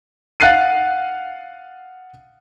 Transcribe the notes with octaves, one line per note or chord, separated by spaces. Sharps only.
F5 F#5 F#6 A6 C7 D#7